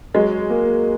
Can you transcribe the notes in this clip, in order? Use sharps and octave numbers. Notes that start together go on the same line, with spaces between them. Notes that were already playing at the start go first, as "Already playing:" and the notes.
F#3 G#3
A#3